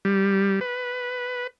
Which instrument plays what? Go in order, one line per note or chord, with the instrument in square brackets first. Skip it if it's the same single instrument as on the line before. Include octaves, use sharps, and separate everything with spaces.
[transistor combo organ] G3
B4